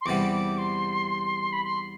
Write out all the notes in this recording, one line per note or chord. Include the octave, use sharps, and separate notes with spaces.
C6
E2 C3 G3 B3 D6
D6
C6
B5
C6